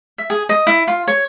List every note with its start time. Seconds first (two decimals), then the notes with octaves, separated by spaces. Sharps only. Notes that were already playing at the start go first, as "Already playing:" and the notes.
0.18 E5
0.30 G#4
0.49 D#5
0.67 E4
0.88 F4
1.08 C#5